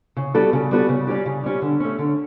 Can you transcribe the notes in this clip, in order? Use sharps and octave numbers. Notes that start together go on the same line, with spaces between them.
C#3
G3 B3 F#4 A4
C#3
G3 B3 F#4 A4
C#3
G3 C#4 G4
C#3
G3 C#4 G4
D3
A3 C#4
D3